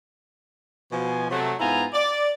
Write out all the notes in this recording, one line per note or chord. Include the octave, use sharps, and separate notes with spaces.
B2 F3 G#5
C3 F#3 A3
G#2 B3 E4 F4 G#5 A#5
D5